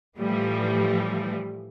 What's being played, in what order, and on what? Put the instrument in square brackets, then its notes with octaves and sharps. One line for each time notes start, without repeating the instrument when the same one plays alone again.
[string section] A2 E3 F3 G3